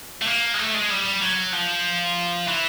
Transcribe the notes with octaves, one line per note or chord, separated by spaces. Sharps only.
A3
A#3
G#3
A3
G#3
G3
F#3
F3
E3